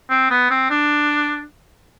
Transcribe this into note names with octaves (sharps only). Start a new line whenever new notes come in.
C4
B3
C4
D4